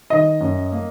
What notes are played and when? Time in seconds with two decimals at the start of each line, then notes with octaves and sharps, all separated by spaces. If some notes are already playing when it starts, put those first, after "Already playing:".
0.10 D#3 D#5
0.41 F#2
0.72 A#3